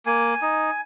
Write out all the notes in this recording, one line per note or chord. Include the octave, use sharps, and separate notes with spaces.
A#3 G#5
D#4